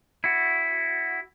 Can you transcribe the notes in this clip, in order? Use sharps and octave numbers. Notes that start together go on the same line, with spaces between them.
E4 F#4